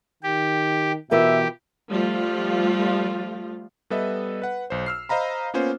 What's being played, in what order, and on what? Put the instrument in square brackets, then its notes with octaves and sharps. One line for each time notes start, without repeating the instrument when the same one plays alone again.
[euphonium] D#3 [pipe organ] G4
[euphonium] B2 [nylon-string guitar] E3 F4 A#4 [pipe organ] G4 [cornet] E5
[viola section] F3 G3 A3 F4
[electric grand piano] G3 B3 A4 B4 D#5 E5
B4 F#5
B1 C5
E6 F6 C7
C5 D#5 F5 A#5 B5
A#3 B3 C#4 F4 C5